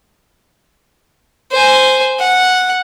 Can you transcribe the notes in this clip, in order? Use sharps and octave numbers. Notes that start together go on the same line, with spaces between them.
C5 G#5
F#5